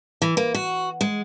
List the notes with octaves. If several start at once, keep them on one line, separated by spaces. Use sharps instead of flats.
E3
A#3
F#4
G#3